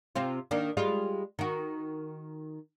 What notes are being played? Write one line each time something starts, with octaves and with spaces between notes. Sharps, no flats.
C3 C4 F4
D#3 A#3 D4
G3 G#3 F4
D#3 F#4